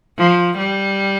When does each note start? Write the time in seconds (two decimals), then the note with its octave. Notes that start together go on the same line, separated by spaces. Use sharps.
0.19 F3
0.57 G3